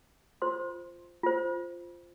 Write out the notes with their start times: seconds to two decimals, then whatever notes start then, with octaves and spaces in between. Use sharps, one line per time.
0.42 F4 C5 C6
1.23 F4 C5